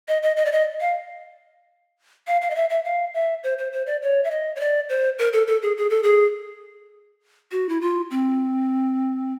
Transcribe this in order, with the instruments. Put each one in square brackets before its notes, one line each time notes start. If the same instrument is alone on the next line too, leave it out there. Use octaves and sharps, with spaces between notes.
[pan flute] D#5
D#5
D#5
D5
D#5
F5
F5
F5
D#5
E5
E5
F5
E5
C5
C5
C5
D5
C#5
E5
D#5
C#5
D5
C5
A#4
A4
A4
G#4
G#4
A4
G#4
F#4
E4
F4
C4